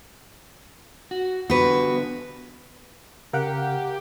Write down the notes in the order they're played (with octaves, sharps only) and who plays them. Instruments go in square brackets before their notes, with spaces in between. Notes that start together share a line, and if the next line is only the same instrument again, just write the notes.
[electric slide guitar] F#4
[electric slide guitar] D3 B3 [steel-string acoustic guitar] F#4 B4
[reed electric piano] C#3 [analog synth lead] G4 [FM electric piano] A#4 F5 F#5